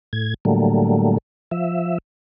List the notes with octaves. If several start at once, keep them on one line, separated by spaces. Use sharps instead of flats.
A2 G#6
A2 D3 F#3 G3 A3 A#3
F3 E5